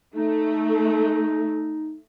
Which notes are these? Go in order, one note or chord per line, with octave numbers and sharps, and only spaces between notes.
A3 D#4